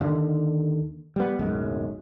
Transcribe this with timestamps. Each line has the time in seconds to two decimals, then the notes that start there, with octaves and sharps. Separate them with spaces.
0.01 D#2 D3 D#3
1.16 G3 B3
1.39 D1 B1 F#2 G#3